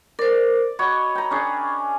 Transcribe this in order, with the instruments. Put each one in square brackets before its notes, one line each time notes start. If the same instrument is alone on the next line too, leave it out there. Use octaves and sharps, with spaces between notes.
[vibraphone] A#4 C5 [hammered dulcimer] D5
[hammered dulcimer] F#4 C#5 D#5 [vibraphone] B5
[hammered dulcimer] G5 A#5
C#4 D4 G#4